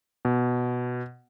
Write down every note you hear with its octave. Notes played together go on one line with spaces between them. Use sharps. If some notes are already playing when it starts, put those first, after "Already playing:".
B2